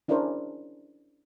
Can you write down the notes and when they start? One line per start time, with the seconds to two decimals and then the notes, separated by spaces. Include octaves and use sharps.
0.08 C#4 D4 E4 G#4 A#4 C5